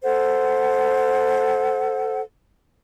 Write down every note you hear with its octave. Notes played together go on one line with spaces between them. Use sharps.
A4 C5 F#5